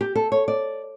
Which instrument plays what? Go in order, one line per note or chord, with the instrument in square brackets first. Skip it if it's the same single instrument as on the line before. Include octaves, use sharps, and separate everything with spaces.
[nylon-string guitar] G4
A4
C#5
D5